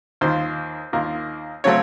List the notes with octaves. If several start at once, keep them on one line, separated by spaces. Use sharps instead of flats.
D#2 D#3 A#3 F4 C5
D#2 D#3 A#3 F4
C#3 F#3 A3 C4 C#5